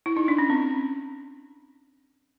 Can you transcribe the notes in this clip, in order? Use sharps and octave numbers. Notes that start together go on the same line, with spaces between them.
E4
D#4
D4
C#4
C4